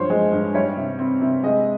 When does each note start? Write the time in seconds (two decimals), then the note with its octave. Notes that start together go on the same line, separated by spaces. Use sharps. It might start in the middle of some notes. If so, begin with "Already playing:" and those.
Already playing: G2 F3 C5 C#5
0.10 G#3
0.32 G2
0.54 G3 C#5
0.77 C3
0.99 C4
1.21 C3
1.43 G#3 D#5